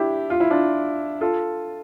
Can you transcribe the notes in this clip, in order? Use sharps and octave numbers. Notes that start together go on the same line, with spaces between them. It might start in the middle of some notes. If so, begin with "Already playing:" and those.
Already playing: D4 E4 G4
F4
E4
D4 F4
F4 A4